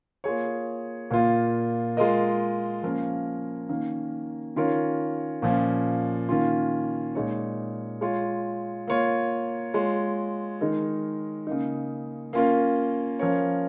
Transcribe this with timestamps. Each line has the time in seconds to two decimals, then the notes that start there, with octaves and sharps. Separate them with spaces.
0.24 A#3 F4 G#4 C#5
1.11 A#2 A#3 F4
1.97 G#3 F4 A#4 D#5
2.83 F3 A#3 C#4 A#4
3.69 D#3 A#3 C#4 A#4
4.56 D#3 C#4 F4 A#4 C#5
5.42 A#2 F3 C#4
6.29 D#3 A#3 C#4 F4
7.15 A#2 G#3 D#4 C#5
8.01 G#3 F4 C#5
8.88 A#3 F4 C#5
9.74 G#3 F4 C#5
10.61 D#3 G#3 D#4 A#4
11.47 C#3 A#3 D#4
12.33 A#3 C#4 F4 A#4
13.19 F3 C#4 A#4 C#5